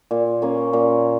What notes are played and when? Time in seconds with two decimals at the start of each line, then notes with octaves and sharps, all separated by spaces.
0.11 A#2
0.42 A#3 C#4 A#4
0.73 A#2